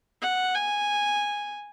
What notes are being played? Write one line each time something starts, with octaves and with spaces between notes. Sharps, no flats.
F#5
G#5